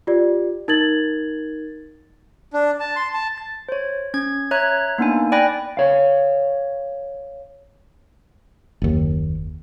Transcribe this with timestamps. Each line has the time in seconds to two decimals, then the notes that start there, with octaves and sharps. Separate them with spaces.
0.07 F4 G4 D5
0.68 D#4 A#4 G#6 A6 F#7
2.53 D4
2.80 A5
2.96 C6
3.14 A5
3.38 A6
3.69 C5 C#5
4.14 C#4 G#6
4.51 C#5 E5 A#5 F#6 G#6
4.98 A#3 B3 D4 D#4 G#5
5.32 D5 G5 G#5 B5 F#6 A#6
5.77 C#5 F5
8.82 F#1 D#2